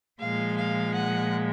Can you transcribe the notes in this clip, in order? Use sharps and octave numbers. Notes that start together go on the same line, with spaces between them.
A#2 F3 G#3 F5
F5
F#5